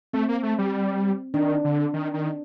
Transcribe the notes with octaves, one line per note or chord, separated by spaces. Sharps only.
A3 C4
A#3
A3
G3
D#3 D4
D3
D#3
D#3